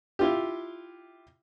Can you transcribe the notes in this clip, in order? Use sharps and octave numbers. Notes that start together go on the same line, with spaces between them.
E4 F4 G4